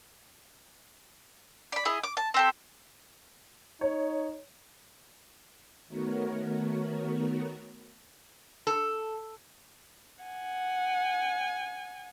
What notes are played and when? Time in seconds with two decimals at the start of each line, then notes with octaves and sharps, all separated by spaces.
1.72 D5 B5
1.85 E4 G#4 D#5
2.04 D6
2.17 A5
2.34 C4 G4 A4
3.81 D#4 C#5
5.88 D#3 A3 B3 F#4 A#4 C#5
8.67 A4
10.24 F#5 G#5